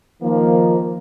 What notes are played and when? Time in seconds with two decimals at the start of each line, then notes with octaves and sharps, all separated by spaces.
0.22 D#3 F3 A#3